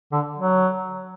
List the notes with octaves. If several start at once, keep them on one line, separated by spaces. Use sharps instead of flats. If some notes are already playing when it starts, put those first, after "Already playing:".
D3
F#3